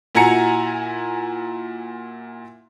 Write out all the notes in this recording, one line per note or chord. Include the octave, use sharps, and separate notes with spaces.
A#2 E4 F#4 G#5 A#5 C#7